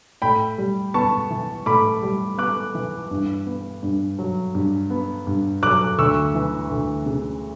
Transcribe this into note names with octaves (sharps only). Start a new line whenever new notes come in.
A2 G5 B5
G3
B3 A5 C#6
E3
A2 B5 D6
G3
B3 D6 F#6
E3
G2
B3
G2
F#3
G2
B3
G2
F#3 D6 F#6
D2 C#6 E6
E3
D2
C#3